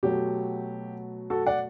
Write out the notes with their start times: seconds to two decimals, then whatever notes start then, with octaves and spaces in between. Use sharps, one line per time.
0.03 B2 F#3 A3 G4
1.30 F#4 A4
1.46 D5 F#5